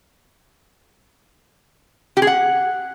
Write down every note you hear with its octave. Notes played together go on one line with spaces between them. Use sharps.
G4
G#4
F#5